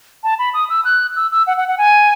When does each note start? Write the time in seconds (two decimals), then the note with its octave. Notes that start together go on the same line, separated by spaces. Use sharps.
0.24 A5
0.39 B5
0.54 D#6
0.70 E6
0.85 F#6
1.16 E6
1.32 E6
1.47 F#5
1.57 F#5
1.68 F#5
1.78 G#5